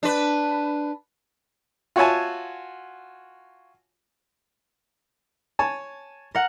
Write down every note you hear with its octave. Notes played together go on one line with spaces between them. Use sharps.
D4 B4
F4 F#4 C#5 E5 G#5 A5
C#5 G#5 A5
A#4 F#5